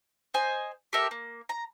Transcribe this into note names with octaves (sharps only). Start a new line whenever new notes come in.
C5 D#5 G#5
G4 A4 A#4 E5
A#3
A#5